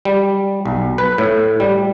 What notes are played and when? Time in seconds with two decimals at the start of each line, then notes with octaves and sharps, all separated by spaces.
0.05 G3
0.66 B1
0.98 B4
1.18 A2
1.60 G3